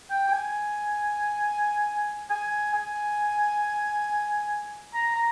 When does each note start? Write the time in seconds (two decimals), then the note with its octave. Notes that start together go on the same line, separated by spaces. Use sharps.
0.10 G5
0.27 G5
0.32 G#5
2.30 G#5
2.74 G#5
4.94 A#5
5.16 A#5